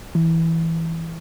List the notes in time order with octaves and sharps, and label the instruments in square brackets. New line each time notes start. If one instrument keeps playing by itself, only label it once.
[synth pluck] E3